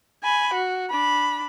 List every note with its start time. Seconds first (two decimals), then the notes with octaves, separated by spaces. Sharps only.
0.23 G#5 B5
0.54 F#4
0.90 D4 B5